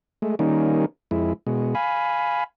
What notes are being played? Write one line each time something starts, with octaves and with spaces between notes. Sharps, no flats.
G#3 A3
D#3 G3 A#3 C#4 D#4
F2 G#3 E4
B2 G#3
F5 G#5 B5